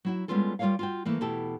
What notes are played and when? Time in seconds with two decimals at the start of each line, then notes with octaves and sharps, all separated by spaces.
0.05 F#3 E4 F#4
0.28 G3 G#3 B3 C#4 F4 A4
0.59 G3 F4 A4 A#4 C#5 F5
0.79 F4 F#4 G5
1.05 E3 A3 A#3
1.21 E2 B2 A3 E4 G4 A4